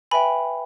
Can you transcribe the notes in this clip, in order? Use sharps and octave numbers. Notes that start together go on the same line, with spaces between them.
B4 E5 G5 G#5 B5